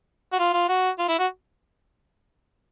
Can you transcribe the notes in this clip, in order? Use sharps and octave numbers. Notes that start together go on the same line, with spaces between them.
F#4
F4
F4
F#4
F4
E4
F#4